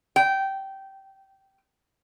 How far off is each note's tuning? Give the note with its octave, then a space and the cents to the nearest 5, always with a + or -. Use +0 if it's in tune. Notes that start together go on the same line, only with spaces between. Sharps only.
G5 -15